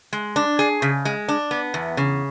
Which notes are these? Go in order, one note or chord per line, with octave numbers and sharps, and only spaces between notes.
G#3
D4
G#4
C#3
G#3
D4
B3
E2
C#3